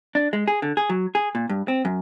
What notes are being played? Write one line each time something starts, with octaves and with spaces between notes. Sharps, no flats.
D4
G#3
G#4
D3
G#4
F#3
G#4
A#2
G2
C4
F#2